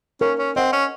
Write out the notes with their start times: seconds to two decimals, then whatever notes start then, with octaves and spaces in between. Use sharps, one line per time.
0.21 C#4 A#4
0.39 C#4
0.56 C4 D#5 F#5
0.73 C#4